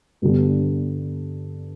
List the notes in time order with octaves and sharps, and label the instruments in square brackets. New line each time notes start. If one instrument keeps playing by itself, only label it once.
[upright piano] G2 D3 G3 B3